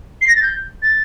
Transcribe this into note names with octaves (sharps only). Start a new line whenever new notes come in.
C7
A#6
A6
G6
A6